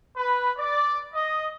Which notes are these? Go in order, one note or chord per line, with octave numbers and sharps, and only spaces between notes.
B4
D5
D#5